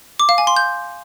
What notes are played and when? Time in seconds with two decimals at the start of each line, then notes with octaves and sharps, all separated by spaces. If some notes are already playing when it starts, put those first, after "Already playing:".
0.20 D6
0.29 F5
0.38 G#5
0.47 C6
0.56 G6